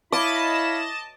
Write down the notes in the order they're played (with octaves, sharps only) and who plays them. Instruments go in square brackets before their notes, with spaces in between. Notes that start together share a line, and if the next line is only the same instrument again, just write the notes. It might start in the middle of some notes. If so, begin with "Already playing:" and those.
[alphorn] E4 [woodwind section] C#5 F5 B5 [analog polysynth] D#5 A5 [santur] D6